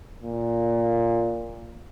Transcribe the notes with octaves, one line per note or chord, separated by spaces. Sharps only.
A#2